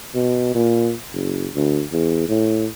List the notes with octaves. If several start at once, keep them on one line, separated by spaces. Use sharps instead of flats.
B2
A#2
F#1
D2
E2
A2